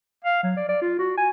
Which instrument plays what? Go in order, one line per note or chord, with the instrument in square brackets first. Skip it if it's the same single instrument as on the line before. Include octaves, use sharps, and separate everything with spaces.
[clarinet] F5
F#3
D5
D5
F4
F#4
G#5